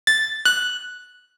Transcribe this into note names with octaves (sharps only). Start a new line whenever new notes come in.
A6
F#6